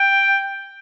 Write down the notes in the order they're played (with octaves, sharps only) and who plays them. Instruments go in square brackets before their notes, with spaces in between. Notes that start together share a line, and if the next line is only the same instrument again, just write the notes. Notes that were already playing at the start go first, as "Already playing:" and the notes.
Already playing: [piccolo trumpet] G5